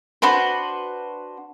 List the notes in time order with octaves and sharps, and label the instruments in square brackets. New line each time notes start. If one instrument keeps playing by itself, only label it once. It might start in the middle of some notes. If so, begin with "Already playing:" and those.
[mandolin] D4 F#4 B4 C5